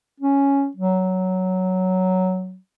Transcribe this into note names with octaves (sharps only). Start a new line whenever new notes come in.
C#4
F#3